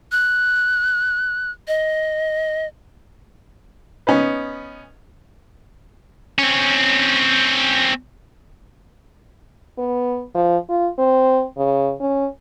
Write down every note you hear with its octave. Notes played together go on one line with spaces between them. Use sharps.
F#6
D#5
B3 C#4 D#4 B4
C4 C#4
B3
F3
F4
C4
C#3
C#4